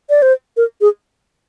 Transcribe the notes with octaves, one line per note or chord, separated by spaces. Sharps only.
D5
C5
A#4
G#4